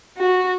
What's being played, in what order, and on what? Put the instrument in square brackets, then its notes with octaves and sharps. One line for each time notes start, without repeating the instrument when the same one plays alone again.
[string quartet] F#4